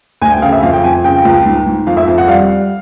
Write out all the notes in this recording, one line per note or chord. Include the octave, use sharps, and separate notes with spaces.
D2 G#5
G5
C#3 F5
E5
F2 F5
G5
F2 G#5
C#3 G5
C#2
G#2
G#2
F2 F5
E5
F2
F#5
G3 F5